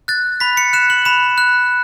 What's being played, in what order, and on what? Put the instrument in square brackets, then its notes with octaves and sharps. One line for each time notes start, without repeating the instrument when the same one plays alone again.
[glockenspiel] F#6 A6
B5 B6
C#7
F#6 E7
F#7
B5 E7
F#6